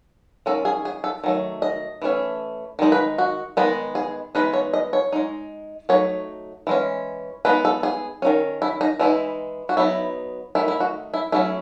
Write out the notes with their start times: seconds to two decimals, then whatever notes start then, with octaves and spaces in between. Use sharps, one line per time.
0.46 D#3 G#3 C#4 A4
0.65 G#4
0.85 G#4
1.04 A4
1.24 D#3 F#3 A3
1.62 D#5
2.02 E3 A3 C#4
2.79 D#3 G#3 D#4
2.92 B4
3.18 F#4
3.57 D#3 G#3 B3 D#4
3.95 G#4
4.35 E3 G#3 B3 D#4 B4
4.53 C#5
4.74 D#5
4.93 C#5
5.12 G#3 D#4
5.89 F#3 A3 D#4 C#5
6.67 E3 G#3 C#4
7.45 G#3 B3 D#4 B4
7.65 A4
7.83 G#4
8.22 D#3 F#3 C#4
8.62 E4
8.81 D#4
8.99 E3 G#3 D#4 E4
9.69 F#4
9.77 F#3 B3 D#4 E4
10.55 D#3 A3 D#4 E4
10.68 E4
10.80 F#4
11.14 E4
11.32 F#3 A3 C#4 E4